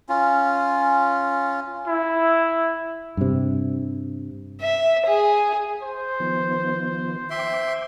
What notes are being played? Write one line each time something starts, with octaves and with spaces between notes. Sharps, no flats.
C#4 F4
E4
G2 C3
E5
G#4
C5
D#3 F3 B3
E5 G5 C6 D6